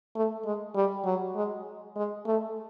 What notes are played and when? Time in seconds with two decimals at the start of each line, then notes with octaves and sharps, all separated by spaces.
0.16 A3
0.45 G#3
0.76 G3
1.05 F#3
1.35 G#3
1.96 G#3
2.26 A3